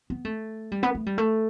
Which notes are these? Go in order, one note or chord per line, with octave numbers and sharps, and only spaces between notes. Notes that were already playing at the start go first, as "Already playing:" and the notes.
B3
A3
G3
B3
A3
G3
A3